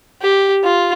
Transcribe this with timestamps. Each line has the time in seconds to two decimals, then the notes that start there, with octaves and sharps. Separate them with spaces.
0.22 G4
0.64 F4